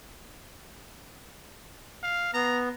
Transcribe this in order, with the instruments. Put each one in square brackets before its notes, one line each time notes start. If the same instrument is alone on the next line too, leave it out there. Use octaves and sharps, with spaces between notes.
[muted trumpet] F5
[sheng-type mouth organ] B3 [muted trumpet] A#5